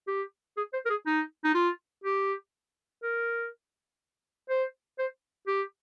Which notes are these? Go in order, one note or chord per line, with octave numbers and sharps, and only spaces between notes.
G4
G#4
C5
A#4
G#4
D#4
D#4
F4
G4
A#4
C5
C5
G4